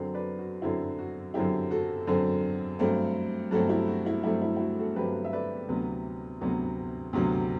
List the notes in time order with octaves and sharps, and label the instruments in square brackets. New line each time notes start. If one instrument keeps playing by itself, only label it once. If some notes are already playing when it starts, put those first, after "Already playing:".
Already playing: [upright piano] F#2 D3 F#3 C4
B4 D5
F#4
F#2 D3 F#3 C4 E4
F#4
F#2 D3 F#3 C4 E4 G4
F#4 A4
F#2 D3 F#3 C4
G2 F#3 A3 C4
G2 F#3 A3 C4 F#4 A4
E4 G4
F#4
E4
G2 F#3 A3 C4 E4
E4
E4
F#4
F#4 A4
G2 F#3 A3 C4 G4 B4
E5
B4 D5
D2 C3 F#3 B3
D2 C3 F#3 B3
D2 C3 F#3 B3